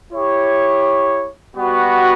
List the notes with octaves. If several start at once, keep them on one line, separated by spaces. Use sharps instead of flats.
E4 G4 C#5
G3 B3 F#4